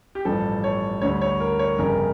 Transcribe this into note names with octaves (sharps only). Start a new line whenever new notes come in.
G4
A1 G2 F3 A4
C#5
D2 D3 G3 C#5
C#5
A#4
C#5
G1 F2 C#3 G3 A#4